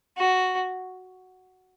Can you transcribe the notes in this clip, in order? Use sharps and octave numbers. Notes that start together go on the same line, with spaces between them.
F#4